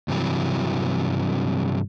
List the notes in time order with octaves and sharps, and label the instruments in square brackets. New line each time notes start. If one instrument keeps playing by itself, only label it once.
[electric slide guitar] G2 C3 E3 F#3